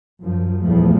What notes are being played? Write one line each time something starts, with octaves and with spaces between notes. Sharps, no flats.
F#2 F3
A#1 E2 F3 G3 A3